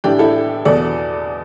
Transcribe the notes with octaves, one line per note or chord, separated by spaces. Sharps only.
A2 E3 D4 G4
E4 A4
E2 B2 A4 D5